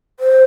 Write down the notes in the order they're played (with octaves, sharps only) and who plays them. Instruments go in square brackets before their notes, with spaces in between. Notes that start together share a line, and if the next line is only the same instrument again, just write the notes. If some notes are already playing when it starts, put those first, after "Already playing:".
[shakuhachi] C5